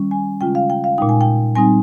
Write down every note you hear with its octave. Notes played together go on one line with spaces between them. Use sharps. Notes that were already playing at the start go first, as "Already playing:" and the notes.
Already playing: D#3 G3 C#4
G#5
C#3 G#3 C#4 F4 G5
F5
G5
F5
A#2 G#3 D#4 G5
G#5
G5
G3 C4 D#4 G#5